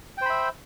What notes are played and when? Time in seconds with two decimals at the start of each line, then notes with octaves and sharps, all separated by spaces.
0.18 G5
0.22 C5
0.26 B5
0.30 E5